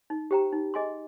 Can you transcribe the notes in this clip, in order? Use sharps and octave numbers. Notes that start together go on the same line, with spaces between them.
D#4
G4 C5 G5 A#5
D#4
G#4 D#5 G#5 C6